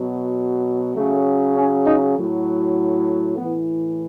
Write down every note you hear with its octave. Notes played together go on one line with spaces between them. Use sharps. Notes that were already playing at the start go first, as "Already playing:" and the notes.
Already playing: B2 F#3
C#3 F#3 A3
C#4
D#4
A2 F#3
A2 E3 B3